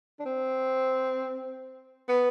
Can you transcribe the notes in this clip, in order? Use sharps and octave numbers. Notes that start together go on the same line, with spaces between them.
D4
C4
B3